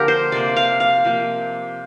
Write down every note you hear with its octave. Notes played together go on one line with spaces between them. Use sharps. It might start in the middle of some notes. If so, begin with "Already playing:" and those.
Already playing: D3 F3 A#3 G4 A#4
C5
C3 F3 A#3 D5
F5
F5
C3 F3 A#3